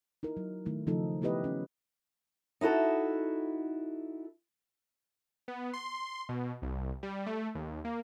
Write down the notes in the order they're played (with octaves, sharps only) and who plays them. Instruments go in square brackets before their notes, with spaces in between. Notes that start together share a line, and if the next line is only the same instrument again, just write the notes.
[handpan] D#4 E4 A#4
F#3
D#3 A3 E4
C#3 F3 A3 D#4 F4 A4
A3 B3 E4 G4 B4 D#5
C#4
[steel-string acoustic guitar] D#4 E4 F#4 A4
[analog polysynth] B3
C6
B2
C2
G3
A3
D#2
A#3